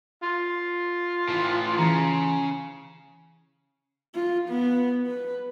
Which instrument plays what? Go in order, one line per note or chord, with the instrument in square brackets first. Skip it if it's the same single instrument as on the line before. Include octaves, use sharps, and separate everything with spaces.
[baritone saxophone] F4
[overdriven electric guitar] A2 E3
[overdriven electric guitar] C#3 [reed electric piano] E3 A#5
[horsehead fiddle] F4
B3
B4